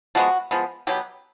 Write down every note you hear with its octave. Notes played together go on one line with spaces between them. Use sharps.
F3 G#3 B3 F#4
F3 G#3 B3
B2 F#3 B3 G4